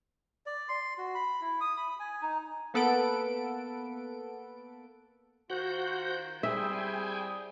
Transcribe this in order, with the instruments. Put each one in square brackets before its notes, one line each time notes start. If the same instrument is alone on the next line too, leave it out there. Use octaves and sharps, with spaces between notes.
[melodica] D5
C6
F#4
B5
E4
D#6
B5
G#5
D#4
[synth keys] A#3 B3 A4 B4 F#5 D7
[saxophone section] D#3 F4 C5 [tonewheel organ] F#4 F#5 G6
[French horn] G3 [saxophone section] C4 E4 G#4 [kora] E5 [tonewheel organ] G5 G#5